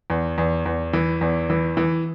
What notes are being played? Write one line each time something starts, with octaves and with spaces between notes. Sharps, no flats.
E2
E2
E2
E3
E2
E3
E3